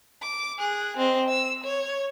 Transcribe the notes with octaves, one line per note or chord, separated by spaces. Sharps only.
D6
G#4 F#6
C4 D#5
E6
C#5